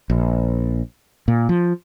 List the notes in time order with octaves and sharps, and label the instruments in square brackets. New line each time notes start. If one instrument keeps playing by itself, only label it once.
[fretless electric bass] A#1
A#2
F3